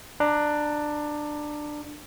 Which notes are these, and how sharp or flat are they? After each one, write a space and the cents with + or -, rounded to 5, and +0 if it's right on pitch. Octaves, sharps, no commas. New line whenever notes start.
D4 +15 A#5 +0